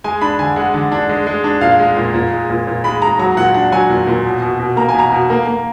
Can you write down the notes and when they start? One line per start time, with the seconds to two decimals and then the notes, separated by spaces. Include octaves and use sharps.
0.04 G#3 G#5
0.21 D4 B5
0.39 D3 G#5
0.56 G#3 F#5
0.74 D3
0.92 D4
1.09 G#3
1.27 G#3
1.44 D4
1.61 A#2 F5
1.79 G#3
1.97 A#2
2.14 A#2
2.32 G#3
2.50 A#2
2.67 A#2
2.84 G#3 B5
3.02 G#3 A#5
3.19 F#3 A#5
3.37 A#2 F#5
3.54 D4 F#5
3.72 F#3 G#5
3.89 A#2
4.07 A#2
4.25 B2
4.42 B2
4.59 B2
4.76 A#3 A#5
4.89 G#5
4.94 B2 A#5
5.12 B2
5.30 A#3
5.47 A#3